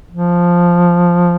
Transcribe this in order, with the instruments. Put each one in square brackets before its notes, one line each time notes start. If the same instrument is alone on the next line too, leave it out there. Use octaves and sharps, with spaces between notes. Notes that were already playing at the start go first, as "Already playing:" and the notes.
[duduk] F3